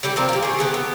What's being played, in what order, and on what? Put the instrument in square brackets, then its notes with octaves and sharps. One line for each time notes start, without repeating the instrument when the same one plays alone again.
[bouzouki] D3 G3 D4 G4
F3 C4 A#4
A#3 G4
D#3 G#4
D3 B3 G4
B3